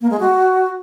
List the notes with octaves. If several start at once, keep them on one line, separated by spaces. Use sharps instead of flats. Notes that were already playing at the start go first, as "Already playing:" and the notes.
A#3
G#3
F#4